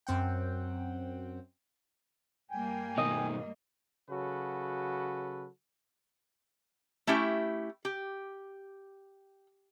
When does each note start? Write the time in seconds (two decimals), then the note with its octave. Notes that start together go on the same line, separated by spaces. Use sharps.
0.07 F#2 C4 F#5 G5
2.51 G2 G3 A#3 G5 G#5
2.98 B2 D#3 D#5
4.10 C#3 F#3 F#4 A4 B4
7.07 A3 C#4 E4 G4 E5
7.85 G4